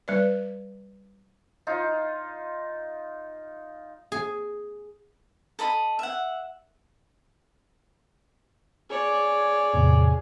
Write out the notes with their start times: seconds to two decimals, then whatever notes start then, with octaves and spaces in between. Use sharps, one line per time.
0.08 G3 B4 D5
1.67 D#4 F4
4.12 G#4
5.59 A4 D#5 B5
5.99 E5 F#5
8.90 G#4 C#5 D5
9.73 E2 A2 C3